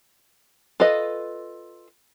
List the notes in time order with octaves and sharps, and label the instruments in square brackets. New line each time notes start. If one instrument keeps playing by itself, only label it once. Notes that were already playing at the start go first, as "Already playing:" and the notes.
[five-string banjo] F4 A4 B4 D#5